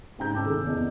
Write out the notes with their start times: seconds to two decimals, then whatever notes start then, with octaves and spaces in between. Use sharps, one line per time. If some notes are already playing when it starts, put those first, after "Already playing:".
0.19 G#2 C#3 G5 A#5 G6
0.33 A1 A5 D6 E6
0.44 C3 D#3 C#4 G#4 A4
0.66 E2 D5 D#5